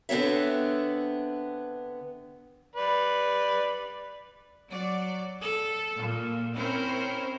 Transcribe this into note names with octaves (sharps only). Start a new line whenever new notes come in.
D3 B3 C4 C#5 E5
B4 D5
F#3 D5
A4
A#2
C4 C#4 E4 A#4 C5 C#5